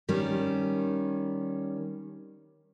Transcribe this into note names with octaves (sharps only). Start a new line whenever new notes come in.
D#3 G3 C#4